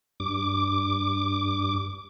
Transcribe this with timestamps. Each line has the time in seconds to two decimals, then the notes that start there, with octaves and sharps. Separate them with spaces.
0.20 G2 D6